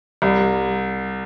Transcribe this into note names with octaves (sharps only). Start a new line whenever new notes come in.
C2